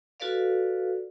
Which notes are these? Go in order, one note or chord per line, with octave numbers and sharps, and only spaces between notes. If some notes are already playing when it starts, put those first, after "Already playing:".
F4 F#4 A4 B4 D5 F5